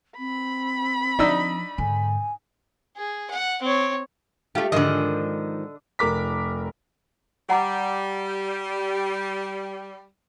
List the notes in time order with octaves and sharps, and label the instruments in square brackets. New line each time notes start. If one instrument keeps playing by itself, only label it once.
[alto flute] C4 [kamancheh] B5
[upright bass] F3 [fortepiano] D4 D#4 E6
[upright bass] G#2 D3 [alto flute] G#5
[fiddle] G#4
F#5
C4 C#5
[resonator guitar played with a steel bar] A3 F4 [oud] G4
[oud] G#2 D#3 F3 [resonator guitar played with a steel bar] D3 D#5
[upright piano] F1 A#4 D6 B6
[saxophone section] G3 [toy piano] F#5 A#5 D6